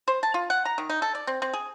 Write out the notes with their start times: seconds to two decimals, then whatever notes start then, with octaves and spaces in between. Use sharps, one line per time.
0.08 C5
0.23 A5
0.34 F4
0.50 F#5
0.65 A#5
0.78 D#3
0.90 D#4
1.02 A4
1.15 D5
1.27 C4
1.42 C4
1.53 G#4